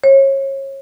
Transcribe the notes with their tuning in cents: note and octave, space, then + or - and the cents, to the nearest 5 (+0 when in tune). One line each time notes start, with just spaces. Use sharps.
C#5 -30